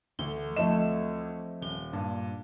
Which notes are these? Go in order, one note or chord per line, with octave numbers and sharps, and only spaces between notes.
D2 E3 A3 G7
F3 A3 C4 D#5 E7
D#1 G7
G2 A#2